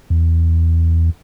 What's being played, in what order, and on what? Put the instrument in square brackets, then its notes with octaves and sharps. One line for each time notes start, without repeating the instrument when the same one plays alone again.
[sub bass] E2